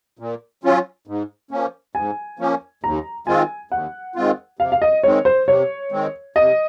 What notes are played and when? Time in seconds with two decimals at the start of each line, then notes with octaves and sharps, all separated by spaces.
0.19 A#2
0.64 F#3 C#4 F4
1.07 G#2
1.51 F3 A#3 C#4
1.95 G#2 G#5
2.39 F3 A#3 C#4
2.84 D#2 A#5
3.27 D#3 G#3 C4 F4 G#5
3.71 D#2 F#5
4.16 D#3 G#3 C4 F4
4.59 C3 F5
4.72 F5
4.82 D#5
5.03 D#3 G#3 C4 C#5
5.25 C5
5.47 C3 C#5
5.92 D#3 G#3 C4
6.36 C3 D#5